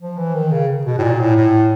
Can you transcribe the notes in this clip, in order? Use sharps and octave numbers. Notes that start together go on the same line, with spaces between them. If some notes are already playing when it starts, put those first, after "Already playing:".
F3
E3
D#3
C#3
B2
A2
A#2
A2
A2